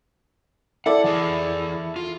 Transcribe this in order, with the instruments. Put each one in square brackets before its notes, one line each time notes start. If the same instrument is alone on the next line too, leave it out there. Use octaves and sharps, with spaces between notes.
[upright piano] E4 A4 D5 [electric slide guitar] F#5
[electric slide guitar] E3 G#4
F4